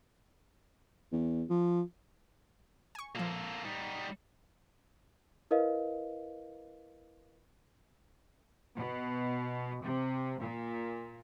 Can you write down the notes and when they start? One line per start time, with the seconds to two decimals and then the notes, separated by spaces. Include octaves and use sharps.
1.12 E2
1.50 F3
2.95 G#5 C#6
3.15 A#2 F3 A#3 A4
3.65 G3 D#4
5.51 E4 A#4 B4 D#5 F5
8.74 B2
9.82 C3
10.38 A#2